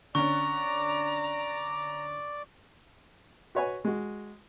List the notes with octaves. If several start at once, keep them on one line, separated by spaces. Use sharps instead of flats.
D3 C#4 D5 A#5 C#6 D6
F#4 B4 C#5 F#5 G#5
G#3 F#4